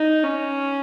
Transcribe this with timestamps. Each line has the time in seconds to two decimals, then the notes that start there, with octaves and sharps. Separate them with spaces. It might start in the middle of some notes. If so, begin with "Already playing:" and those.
Already playing: D#4
0.24 C#4